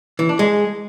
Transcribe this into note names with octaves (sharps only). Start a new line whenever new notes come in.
E3
D4
G#3